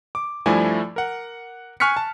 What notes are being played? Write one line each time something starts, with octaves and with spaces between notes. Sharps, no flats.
D6
G2 F3 A3 E4 D5 G#5
A#4 F#5
G#5 C#6 F6 F#6 B6 C#7
A5